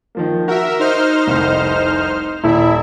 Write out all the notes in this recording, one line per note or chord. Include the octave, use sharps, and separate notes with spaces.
D#3 F3 A#3
F#4 A#4 E5
D#4 C5 F6
F1 C2
D#1 E4 E5